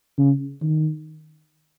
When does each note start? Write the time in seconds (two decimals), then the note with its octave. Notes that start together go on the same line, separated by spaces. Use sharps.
0.18 C#3
0.62 D#3